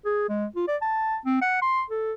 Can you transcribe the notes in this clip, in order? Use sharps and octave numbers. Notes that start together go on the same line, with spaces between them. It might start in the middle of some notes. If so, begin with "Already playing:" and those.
G#4
G#3
F4
D5
A5
C4
F#5
C6
A4